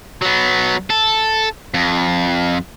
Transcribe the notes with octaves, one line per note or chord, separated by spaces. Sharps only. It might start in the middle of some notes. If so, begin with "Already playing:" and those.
F#3 B3
A4
F2